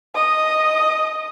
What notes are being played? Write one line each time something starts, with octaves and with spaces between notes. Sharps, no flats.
D#5 D#6